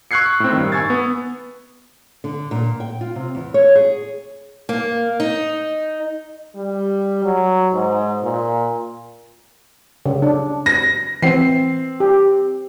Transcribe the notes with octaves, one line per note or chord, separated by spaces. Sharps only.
C#6 E6 F#6 G#6 C7 C#7
A2 C4
G2 D#3
G#5 C#6 E6 G#6 A6
B3
D3
A#2
G5
F4
C3
E2
C#5
G#4
A#3
D#4
G3
F#3
G#2
A#2
C#3
D4
A#6
E3 C4 C7
G4